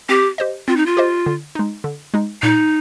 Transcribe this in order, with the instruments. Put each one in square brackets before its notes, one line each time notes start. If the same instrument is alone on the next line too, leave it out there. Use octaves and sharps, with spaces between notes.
[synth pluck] C4 [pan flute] G4
[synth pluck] G4 C5 D#5
[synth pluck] C4 [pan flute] F4
[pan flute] D#4
F4
[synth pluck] G4 C5 D#5
D3
G#3 D#4
D3
G#3 D#4
[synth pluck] A#2 [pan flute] D#4